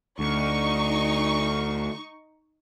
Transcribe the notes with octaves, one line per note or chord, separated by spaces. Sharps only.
D2 D#4 C#6